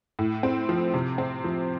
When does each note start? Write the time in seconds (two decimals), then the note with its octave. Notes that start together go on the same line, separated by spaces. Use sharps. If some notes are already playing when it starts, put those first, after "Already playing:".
0.19 A2
0.43 C4
0.69 F3
0.94 C3
1.18 C4
1.44 F3